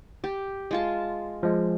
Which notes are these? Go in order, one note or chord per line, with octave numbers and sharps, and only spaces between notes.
G4
G#3 F4 A5
F3 G#3